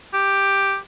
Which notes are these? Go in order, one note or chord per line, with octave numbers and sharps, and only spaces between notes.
G4